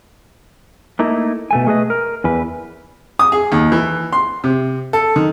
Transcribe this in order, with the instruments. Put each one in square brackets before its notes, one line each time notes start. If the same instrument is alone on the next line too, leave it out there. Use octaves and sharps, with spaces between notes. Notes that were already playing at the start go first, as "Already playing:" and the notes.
[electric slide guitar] A3 A#3 D#4 E4
B2 A3 G#5
A3 G#4 B4 D#5
A#4
E2 E3 B4
[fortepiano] D#6
G#4
D#2
E3
C6
C3
A4
D#3